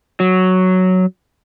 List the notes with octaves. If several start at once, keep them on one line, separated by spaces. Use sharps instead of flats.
F#3